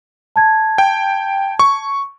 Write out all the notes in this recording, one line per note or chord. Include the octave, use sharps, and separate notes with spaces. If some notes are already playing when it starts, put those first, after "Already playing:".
A5 G#6
G5
C#6